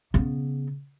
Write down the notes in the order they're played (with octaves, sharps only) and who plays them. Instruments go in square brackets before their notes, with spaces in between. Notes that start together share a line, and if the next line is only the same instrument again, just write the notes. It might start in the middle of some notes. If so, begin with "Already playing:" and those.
[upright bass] C#3 B3